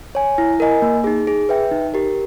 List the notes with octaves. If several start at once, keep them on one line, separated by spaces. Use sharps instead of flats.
C#5 G#5
E4
A#4 D#5 G#5
A#3
D#4 G#4
G#4
B4 E5 G5
D#4
G4 A#4